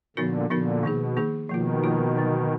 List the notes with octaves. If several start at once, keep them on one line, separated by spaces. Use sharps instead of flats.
A#2 D3 F3 B3 D#4 F#4 A#4
A#2 D3 F3 B3 D#4 F#4 A#4
B2 D#3 A#3 D#4 G#4
D#3 A#3 D#4 G#4
B2 D#3 F3 A#3 F4
F3 A#3 F4
D3 F#3 B3